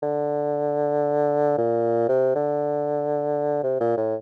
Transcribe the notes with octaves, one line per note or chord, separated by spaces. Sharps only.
D3
A#2
C3
D3
C3
A#2
A2